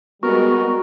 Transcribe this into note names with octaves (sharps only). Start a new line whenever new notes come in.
G3 G#3 B3 F#4 A#4